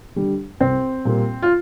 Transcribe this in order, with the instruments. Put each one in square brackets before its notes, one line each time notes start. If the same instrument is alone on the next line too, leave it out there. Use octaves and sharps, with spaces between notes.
[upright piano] D3 G3
[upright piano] C2 [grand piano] C4
[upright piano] A#2 G3 A#3 F4
[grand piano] F4